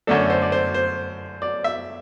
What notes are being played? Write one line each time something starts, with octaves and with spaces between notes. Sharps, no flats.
F#2 D3 A3 D4 A4
C5
D5
C5
C5
D5
E5